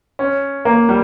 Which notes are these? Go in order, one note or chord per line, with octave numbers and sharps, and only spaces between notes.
C#4
A#3
G3